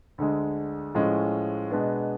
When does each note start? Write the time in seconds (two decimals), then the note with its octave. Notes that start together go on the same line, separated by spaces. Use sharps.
0.18 D2 D3 G#3
0.95 A2 F3 G#3 C#4
1.70 B2 G#3 B3 D4